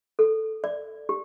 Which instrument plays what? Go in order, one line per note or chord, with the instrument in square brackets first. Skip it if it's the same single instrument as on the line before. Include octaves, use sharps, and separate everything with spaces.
[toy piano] A4
D5
G4